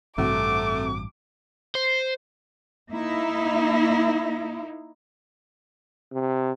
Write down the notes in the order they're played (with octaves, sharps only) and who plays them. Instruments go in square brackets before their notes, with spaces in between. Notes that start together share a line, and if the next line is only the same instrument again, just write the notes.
[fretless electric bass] A1 G2 [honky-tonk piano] C3 F#4 [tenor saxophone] A3 [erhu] D6
[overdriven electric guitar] C5
[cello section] A#3 D#4 E4
[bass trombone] C3